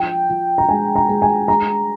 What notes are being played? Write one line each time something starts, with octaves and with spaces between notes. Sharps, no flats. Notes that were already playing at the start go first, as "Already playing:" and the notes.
Already playing: F3 G5
F3
A#5
G#3 G#5
A#5
G#3
G#5
G#3 A#5